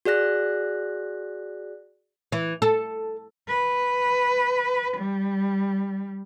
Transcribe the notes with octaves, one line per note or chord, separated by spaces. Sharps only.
F#4 G#4 D5 F#6 A#6
E3
A4
B4
G3